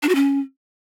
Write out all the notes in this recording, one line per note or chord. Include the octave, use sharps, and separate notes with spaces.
D4
F#4
C#4